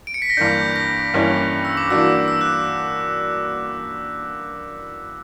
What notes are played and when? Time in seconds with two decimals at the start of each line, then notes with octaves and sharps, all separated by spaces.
0.07 D7
0.14 C#7
0.22 B6
0.30 A#6
0.37 G2 E3 A#3 D4 G6
0.76 A#6
1.14 G2 E3 A#3 C#4 E4
1.65 E6
1.77 D6
1.90 E3 A#3 D4 F#4 E6
2.28 E6
2.41 F#6